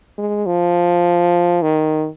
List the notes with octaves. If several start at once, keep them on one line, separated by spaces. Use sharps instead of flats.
G#3
F3
D#3